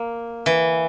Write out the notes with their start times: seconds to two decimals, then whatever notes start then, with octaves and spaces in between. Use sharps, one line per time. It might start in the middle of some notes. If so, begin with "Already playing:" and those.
Already playing: A#3
0.46 E3